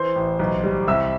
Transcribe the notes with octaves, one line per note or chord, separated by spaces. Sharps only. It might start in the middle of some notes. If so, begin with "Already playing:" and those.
Already playing: E3 C5 C6
A1
B1
G3
C2 E5 E6